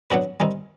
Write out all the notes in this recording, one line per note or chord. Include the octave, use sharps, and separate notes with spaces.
F#3 B3 D4 F#4 B4
D#3 G3 C4 D#4